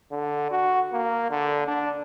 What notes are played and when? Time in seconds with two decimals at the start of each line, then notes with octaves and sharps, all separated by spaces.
0.11 D3
0.50 F#4
0.93 A#3
1.30 D3
1.68 D4